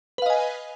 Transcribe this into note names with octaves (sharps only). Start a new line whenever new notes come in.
B4 D#5 F5 G#5